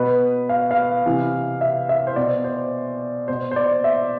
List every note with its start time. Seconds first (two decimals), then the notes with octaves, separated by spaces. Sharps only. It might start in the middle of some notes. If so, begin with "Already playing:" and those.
Already playing: B2 B4
0.49 F5
0.71 F5
1.06 C3 E3
1.61 E5
1.89 E5
2.07 C5
2.16 B2 D5
2.44 C5
3.28 B2 C5
3.51 C5
3.56 D5
3.84 E5